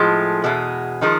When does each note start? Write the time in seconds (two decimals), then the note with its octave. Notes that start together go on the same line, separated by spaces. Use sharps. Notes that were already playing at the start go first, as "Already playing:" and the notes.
Already playing: A2 F3 G#3
0.44 E2 B2 G#3
1.01 D#3 F3 G#3 D#4